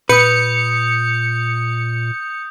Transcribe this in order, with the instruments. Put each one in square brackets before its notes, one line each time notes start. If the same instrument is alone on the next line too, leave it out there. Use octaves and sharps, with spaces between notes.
[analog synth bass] A#2 [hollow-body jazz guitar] B4 [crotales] D#6 G6 [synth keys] C#7